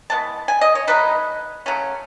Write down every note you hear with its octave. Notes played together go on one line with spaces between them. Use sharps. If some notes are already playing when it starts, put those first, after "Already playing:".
E3 G#3 B3 A5
G#5
D#5
C#5
F#3 A3 D#4 B4
C#3 F#3 A3 C#4